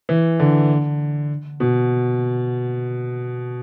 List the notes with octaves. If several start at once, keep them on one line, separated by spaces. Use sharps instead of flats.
E3
D3
B2